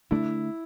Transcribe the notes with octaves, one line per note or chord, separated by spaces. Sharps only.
D3 A3 D4 E4